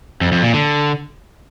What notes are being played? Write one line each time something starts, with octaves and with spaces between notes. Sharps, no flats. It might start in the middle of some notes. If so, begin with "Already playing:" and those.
F2
F2
A#2
D3